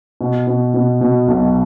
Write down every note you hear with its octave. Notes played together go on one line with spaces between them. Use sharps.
B2
B2
B2
B2
B1